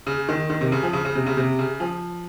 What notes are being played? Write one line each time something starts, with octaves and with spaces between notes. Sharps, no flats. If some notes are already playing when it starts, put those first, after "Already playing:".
C#3
D#3
D#3
C3
C#3
F3
C#3
C#3
C3
C#3
C3
C#3
F3